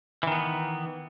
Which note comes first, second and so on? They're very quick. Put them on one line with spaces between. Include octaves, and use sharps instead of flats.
E3 D#3 B3